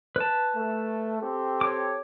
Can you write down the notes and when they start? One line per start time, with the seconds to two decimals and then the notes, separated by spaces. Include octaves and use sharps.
0.16 B4 A5
0.56 A3
1.21 C4 G4 A4
1.61 C#5 D6